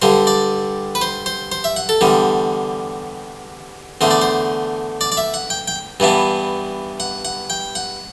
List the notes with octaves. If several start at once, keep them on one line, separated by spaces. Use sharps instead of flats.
G2 D3 G3 C5
D5
B4
C5
C5
C5
E5
F#5
A4
E2 D3 G3
E2 D3 A3 C5
D5
C5
D5
D5
E5
F#5
G5
G5
G2 E3 B3 D4
F#5
F#5
G5
F#5